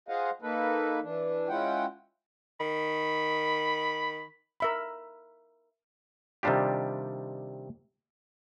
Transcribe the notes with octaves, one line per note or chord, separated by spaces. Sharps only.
F4 G#4 C5 D#5 F5 F#5
A#3 D#4 A4 B4
E3 D4
G#3 C#4 E4 F4 F#5 G5
D#3 B5
A#4 E5 B5
C3 D#3 G3 D4 F4 G4